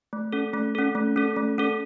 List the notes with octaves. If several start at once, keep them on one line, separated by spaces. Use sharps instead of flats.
A3
C#4 A4
A3
C#4 A4
A3
C#4 A4
A3
C#4 A4